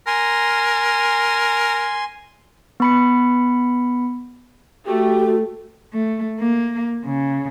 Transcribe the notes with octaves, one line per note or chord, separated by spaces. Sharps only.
A#4 G#5 C6
B3 B5 C#7
A3 F#4 G4
A3
A#3
C#3